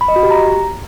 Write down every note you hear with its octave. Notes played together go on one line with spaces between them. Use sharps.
B5
D#5
F#4
G4
A#5